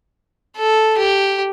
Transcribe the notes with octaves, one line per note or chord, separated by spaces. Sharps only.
A4
G4